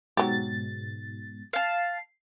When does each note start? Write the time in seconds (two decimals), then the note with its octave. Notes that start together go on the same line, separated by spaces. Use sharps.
0.17 G#2 B2 F#3 G4 A6
1.53 F5 A5 C7